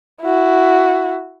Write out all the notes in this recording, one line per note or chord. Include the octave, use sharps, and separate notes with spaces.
E4 F#4